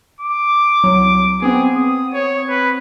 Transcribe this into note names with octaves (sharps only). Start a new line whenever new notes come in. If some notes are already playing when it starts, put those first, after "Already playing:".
D6
C2 F#3
B3 C4 G#4
D#6
C#5
B4